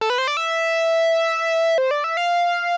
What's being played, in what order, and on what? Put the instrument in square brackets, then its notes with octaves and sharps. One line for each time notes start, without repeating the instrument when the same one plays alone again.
[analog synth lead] A4
B4
C5
D5
E5
C5
D5
E5
F5